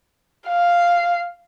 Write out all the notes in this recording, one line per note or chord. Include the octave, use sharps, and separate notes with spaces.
F5